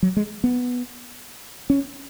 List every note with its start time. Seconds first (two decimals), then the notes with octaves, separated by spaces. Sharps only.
0.03 F#3
0.17 G#3
0.44 B3
1.70 C#4